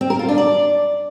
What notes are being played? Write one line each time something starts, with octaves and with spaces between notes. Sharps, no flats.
C4
A#4
F4
D4
D5